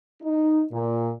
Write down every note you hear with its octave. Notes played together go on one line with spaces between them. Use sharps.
D#4
A#2